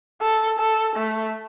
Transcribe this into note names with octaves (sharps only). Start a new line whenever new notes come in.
A4
A4
A3